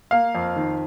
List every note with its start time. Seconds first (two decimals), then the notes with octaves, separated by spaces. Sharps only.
0.11 A#3 F5
0.35 F2
0.56 D#3